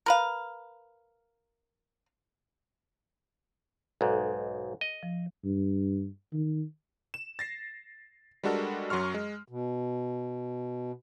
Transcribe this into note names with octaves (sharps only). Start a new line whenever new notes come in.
A#4 B4 F5
B1 G#2 A4
D#5
F3
G2
D#3
E7
A6 A#6 C7
G3 G#3 D4 F#4 A4 A#4
F#2 F#3 C6 C#6 F6
G#3
B2